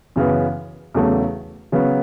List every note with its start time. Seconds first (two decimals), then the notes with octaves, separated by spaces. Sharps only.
0.16 F#2 C#3 E3 B3
0.94 E2 C#3 F#3 A3
1.72 C#3 F#3 B3